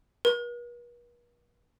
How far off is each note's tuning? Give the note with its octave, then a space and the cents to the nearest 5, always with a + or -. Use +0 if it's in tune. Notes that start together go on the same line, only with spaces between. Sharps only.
B4 -45